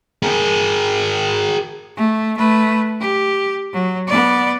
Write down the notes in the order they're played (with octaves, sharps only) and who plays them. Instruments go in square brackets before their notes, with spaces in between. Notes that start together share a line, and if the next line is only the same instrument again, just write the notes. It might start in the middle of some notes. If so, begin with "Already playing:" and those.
[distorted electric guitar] G#4 A#4
[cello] A3
A3 B4
G4
F#3
B3 D5